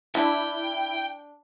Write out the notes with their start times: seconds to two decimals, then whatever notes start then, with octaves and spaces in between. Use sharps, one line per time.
0.15 D4 E4 G5